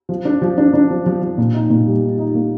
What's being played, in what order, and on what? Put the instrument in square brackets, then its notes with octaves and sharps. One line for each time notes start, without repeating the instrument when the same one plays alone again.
[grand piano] F3
D4
F3
D4
D4
F3
F3
F3
A#2
D#4
A#2
G3
D#4
D#4
A#3